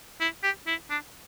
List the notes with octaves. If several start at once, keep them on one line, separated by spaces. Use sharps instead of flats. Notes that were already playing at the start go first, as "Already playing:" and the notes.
E4
G4
E4
D4